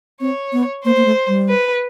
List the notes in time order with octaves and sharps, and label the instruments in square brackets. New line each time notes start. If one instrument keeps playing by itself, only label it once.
[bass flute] C4 [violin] C#5
[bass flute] B3
[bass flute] A#3 [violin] C5
[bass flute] A#3
A3
G3
[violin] B4